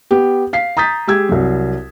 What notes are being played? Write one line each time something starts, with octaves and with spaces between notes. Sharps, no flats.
B3 G4
F5 B6 C7
A#5 D#6 G6 A6 B6
G#3 G4 E6 G#6
C2 F#3